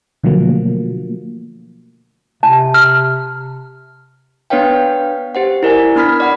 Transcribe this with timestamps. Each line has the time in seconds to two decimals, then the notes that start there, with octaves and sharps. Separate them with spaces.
0.23 B2 D3 F3 F#3 A3 A#3
2.43 C3 A5
2.74 F6
4.50 B3 D4 B4 C#5 F5 G5
5.35 G4 C5 F#5
5.63 E4 A#4 D5 G#5
5.95 B3 D4 B5 F6 B6
6.20 D5 F#5 B5